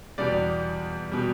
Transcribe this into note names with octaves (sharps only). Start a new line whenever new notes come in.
E2 B2 G3 D5
B2 G3